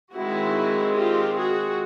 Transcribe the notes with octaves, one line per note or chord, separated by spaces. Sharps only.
D#3 G#3 C4 E4 F#4
F4 G4
F#4 G#4